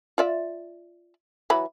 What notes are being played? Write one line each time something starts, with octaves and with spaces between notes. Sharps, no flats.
F4 D5 E5
E3 F#3 B5